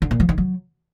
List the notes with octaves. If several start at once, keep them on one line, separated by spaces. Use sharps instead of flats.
D3
A#2
F3
D#3
F#3